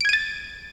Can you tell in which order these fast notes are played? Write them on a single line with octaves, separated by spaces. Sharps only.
D7 G#6 D#7 A6